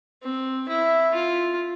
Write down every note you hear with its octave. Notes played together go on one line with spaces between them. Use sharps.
C4
E4
F4